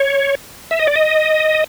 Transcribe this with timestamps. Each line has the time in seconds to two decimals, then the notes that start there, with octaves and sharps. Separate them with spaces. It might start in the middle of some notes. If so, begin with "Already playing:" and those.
Already playing: C#5
0.71 E5
0.79 D#5
0.87 D5
0.96 D#5